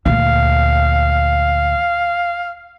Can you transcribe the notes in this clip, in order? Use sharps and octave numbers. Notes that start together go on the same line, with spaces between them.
D2 A#2 F5